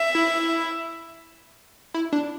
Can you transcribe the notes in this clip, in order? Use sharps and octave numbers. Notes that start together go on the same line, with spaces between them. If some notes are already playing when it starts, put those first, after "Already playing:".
Already playing: E5
E4
E4
D4